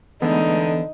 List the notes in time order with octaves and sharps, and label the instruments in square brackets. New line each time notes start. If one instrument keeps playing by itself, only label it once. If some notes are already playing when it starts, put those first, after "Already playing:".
[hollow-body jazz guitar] E2 [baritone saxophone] D3 [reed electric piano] G#3 A3 B3 [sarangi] D#4